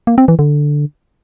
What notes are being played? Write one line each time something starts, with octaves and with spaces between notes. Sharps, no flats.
A#3
C4
E3
D3